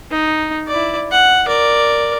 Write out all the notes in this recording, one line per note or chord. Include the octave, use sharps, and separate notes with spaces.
D#4
E4 D5
F#5
A#4 D5